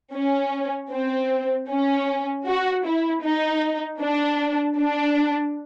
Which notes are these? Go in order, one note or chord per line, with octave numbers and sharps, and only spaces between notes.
C#4
C4
C#4
F#4
E4
D#4
D4
D4